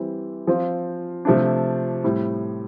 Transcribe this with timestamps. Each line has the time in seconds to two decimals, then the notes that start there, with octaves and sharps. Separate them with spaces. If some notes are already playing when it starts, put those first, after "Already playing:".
Already playing: E3 G3 C4
0.47 F3 C4 F4
1.25 C3 F3 A3 D4
2.04 A2 G3 C4